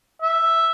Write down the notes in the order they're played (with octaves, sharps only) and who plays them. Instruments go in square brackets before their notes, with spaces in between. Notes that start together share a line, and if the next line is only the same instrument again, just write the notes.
[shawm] E5